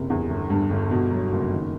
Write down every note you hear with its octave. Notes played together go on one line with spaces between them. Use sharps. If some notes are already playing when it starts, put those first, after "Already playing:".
Already playing: F#1 C3
E2
G1
G2
G1
B2
F#3
F#1
D#3